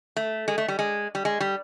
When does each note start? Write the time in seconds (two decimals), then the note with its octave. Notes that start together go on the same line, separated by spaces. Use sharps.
0.16 A3
0.48 G#3
0.58 A3
0.68 G3
0.79 G#3
1.15 G3
1.25 G#3
1.40 G3